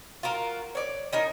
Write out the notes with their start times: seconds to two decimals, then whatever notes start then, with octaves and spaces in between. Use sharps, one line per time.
0.23 F4 F#4 A#4
0.75 C#5 D5
1.13 C#4 D#4 A#4